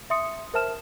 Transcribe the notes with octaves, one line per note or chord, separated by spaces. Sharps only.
E5 C6 D#6 C#7
A#4 C5 E5 A5 F6 E7